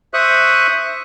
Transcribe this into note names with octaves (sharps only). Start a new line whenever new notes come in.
C5 E5 C#6 D#6 F#6